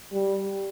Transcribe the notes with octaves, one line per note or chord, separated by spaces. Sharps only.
G3